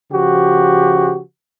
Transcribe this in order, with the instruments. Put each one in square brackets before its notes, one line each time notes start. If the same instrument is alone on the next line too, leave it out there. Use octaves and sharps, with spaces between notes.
[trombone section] C#3 F3 F#4 G4